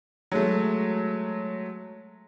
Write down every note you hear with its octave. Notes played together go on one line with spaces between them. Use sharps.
F#3 G#3 A3